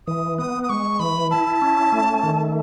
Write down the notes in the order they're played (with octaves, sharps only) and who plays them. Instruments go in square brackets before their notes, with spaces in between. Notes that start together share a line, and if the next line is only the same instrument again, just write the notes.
[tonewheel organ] E3 [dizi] D#6
[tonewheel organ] B3 [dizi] D#6
[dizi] D#6
[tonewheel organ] G#3 [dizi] C#6
[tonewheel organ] E3 [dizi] B5
[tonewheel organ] E4 [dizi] A5
[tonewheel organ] C#4
A3
D#3